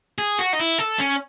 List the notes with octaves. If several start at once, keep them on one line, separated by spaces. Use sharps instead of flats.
G#4
F#4
D#4
E4
A4
C#4